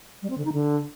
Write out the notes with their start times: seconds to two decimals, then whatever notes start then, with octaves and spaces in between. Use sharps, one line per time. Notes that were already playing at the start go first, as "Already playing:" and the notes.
0.22 G3
0.30 C4
0.38 D3
0.45 D#4
0.53 D3